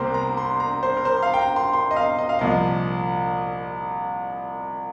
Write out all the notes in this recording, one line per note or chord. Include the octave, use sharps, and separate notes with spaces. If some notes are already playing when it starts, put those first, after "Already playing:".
Already playing: C2 C3 G3 A#3 A#4 C5
A#5
C6
A#5
C5
A#4
C5
F5
G5
A#5
C6
C6
D#5
F5
D#5
F5
C2 A#2 F3 D#5